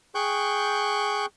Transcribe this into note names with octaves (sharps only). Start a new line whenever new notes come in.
G#4 G5 C#6 F#6 G6